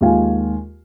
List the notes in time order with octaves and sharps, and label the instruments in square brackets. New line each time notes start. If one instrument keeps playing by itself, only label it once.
[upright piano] D#2 G#3 F4 F5 G#5